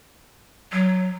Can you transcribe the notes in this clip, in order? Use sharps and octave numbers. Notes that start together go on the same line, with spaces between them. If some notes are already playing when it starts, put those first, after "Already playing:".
F#3